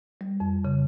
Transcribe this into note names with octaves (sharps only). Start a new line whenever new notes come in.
G3
F2
C#3